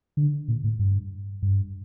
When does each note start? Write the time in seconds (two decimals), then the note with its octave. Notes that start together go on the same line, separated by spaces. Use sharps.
0.17 D3
0.48 A#2
0.64 A2
0.79 G2
1.42 G2